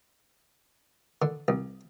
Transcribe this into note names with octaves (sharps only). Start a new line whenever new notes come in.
D3
C2